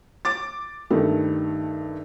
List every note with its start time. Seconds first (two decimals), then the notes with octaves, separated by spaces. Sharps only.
0.25 D6 A6
0.90 G2 D#3 A3